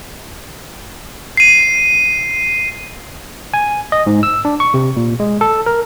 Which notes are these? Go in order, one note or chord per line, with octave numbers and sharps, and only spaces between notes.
C7 D#7
G#5
D#5
G#2
E6
D4
C#6
C3
A#2
G#3
A4
A#4